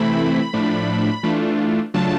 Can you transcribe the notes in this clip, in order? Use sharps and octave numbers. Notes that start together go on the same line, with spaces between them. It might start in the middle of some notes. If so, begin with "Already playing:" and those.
Already playing: C3 E3 A3 C4 E4 B5
A2 F3 A3 D4
E3 A3 D4 F4
C#3 F#3 A3 D4 F4 A5